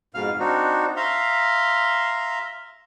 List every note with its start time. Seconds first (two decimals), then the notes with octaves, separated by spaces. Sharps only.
0.14 F2 G#2 B2 F5 F6
0.39 C4 D4 D#4 F#4
0.96 E5 F5 A#5 C6